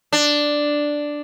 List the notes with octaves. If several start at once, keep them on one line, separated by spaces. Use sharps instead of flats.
D4